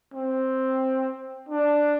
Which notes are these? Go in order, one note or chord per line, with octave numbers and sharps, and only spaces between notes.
C4
D4